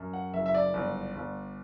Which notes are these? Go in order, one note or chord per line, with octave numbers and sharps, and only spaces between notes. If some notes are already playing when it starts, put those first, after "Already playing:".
Already playing: F#2
F#5
F#1 E5
E5
D5
G1
G1